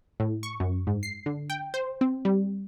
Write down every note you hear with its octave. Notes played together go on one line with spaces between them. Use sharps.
A2
C#6
F#2
G#2
C7
D3
G5
C5
C4
G3